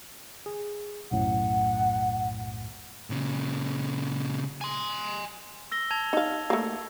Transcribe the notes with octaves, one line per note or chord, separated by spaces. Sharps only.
G#4
B1 F#2 A2 F#5
A#2 C#3
G#5 C6
E6 A#6 G7
A5 G#6 F7
D#4 F5
A3 A#3